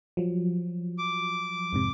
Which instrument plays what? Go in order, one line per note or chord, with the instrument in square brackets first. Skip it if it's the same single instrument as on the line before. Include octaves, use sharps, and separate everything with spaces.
[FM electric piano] F3 F#3
[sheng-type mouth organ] D6
[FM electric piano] F2 G#2 C3